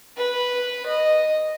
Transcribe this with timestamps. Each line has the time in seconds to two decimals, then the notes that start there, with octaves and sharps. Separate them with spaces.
0.17 B4
0.86 D#5